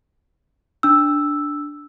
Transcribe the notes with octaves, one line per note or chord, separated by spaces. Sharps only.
D4 E6